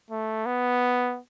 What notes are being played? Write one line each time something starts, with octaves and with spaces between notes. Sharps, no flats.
A3
B3